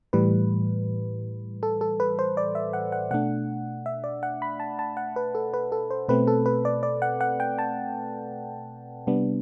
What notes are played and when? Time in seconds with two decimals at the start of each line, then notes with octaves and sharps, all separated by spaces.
0.13 A2 E3 G3 B4
1.63 A4
1.81 A4
2.00 B4
2.19 C5
2.37 D5
2.55 E5
2.73 F#5
2.92 F#5
3.11 B2 A3 D4 F#5
3.86 E5
4.04 D5
4.23 F#5
4.42 B5
4.60 A5
4.79 A5
4.97 F#5
5.16 B4
5.35 A4
5.54 B4
5.72 A4
5.91 C5
6.08 B2 A3 C4 B4
6.28 A4
6.46 B4
6.65 D5
6.83 D5
7.02 F#5
7.21 F#5
7.40 G5
7.59 A5
9.07 C3 G3 B3 D4